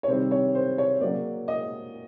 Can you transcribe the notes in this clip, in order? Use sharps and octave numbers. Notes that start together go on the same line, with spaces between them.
C#5
C3 D#3 G3 C4 C5
C#5
C5
C#5
C#3 F#3 A#3 D5
D#5